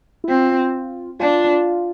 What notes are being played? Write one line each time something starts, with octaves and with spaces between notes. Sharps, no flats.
E4
C4 F4
D4 F4